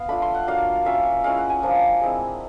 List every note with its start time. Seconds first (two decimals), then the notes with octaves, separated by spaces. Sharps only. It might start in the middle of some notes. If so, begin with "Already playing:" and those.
Already playing: B3 F5
0.08 A3 D4 F4 B5
0.22 C6
0.34 F#5
0.47 F#3 A#3 D4 F5
0.86 A#3 C#4 F4 E5
1.24 G#3 C#4 E4 F5
1.38 F#5
1.50 G#5
1.63 F3 A#3 D4 F4
2.01 G#3 C4 E4